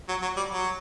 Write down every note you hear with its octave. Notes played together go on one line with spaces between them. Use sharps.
F#3
F#3
G3
F#3